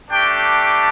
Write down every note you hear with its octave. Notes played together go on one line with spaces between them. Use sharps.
A3 D4 G4 G5